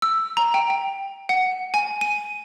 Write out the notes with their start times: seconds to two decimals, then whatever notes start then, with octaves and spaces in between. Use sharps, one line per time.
0.02 E6
0.37 A#5
0.54 G5
0.70 G5
1.29 F#5
1.74 G#5
2.01 D#7